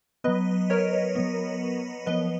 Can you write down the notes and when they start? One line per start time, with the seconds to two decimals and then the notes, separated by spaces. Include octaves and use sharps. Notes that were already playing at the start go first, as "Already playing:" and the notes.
0.24 F#3 B3 B4 D#5
0.70 A#4 C#5
1.15 F#3 B3
2.06 F3 B3 B4 D#5